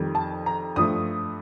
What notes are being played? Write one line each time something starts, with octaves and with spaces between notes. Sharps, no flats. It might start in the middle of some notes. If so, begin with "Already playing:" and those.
Already playing: F2 D#3 G3
A5
A#5
G2 F3 A3 D#6